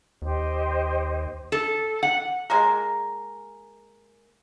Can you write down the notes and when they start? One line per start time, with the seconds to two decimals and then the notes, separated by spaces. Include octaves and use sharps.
0.22 D#2 G4 C5 D#5
1.52 A4
2.03 F#5
2.50 G#3 A#3 A#4